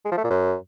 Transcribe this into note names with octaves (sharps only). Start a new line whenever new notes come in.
G#3
F3
A3
A#2
F#2